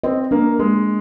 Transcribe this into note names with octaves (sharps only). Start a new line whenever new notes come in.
C4 D#5
A#3 D4
G#3 A#3